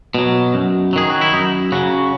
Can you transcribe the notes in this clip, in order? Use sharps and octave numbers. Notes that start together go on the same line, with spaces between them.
B2 F#3
F#2
D#3 F#3 G#4
F#4
E4
F#2 D#4
C#3 F#3 F#4